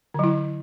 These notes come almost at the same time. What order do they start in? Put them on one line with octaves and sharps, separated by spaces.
D3 F#3 E4